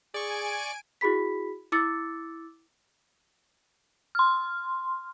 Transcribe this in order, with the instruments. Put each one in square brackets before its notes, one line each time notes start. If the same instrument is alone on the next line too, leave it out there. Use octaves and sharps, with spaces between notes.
[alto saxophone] G#4 [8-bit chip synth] D5 C#6 [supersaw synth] G#5 D7
[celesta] E4 F#4 G#4 B5 B6
E4 D6 E6 A6 C#7
[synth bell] C6 F6